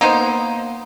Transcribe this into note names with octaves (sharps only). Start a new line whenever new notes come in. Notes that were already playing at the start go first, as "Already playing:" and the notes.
A#3 B3 D#4 C5